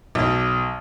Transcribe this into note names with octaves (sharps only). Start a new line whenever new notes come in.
B1